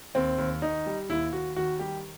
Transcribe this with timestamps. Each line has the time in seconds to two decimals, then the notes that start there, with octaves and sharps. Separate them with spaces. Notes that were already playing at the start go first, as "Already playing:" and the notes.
0.15 D#2 C4
0.38 D#2
0.62 D#3 D#4
0.86 G3
1.09 D#2 E4
1.33 D#2 F#4
1.56 D#3 F#4
1.79 G3 G4